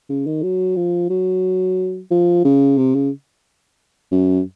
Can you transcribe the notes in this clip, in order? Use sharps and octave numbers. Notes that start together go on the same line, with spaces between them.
C#3
D#3
F#3
F3
F#3
F3
C#3
C3
C#3
F#2